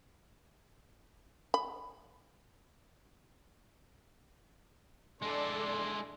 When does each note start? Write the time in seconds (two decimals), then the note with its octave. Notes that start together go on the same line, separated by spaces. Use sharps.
1.54 B5
5.22 G#3 D4 E4 A4 D5 C6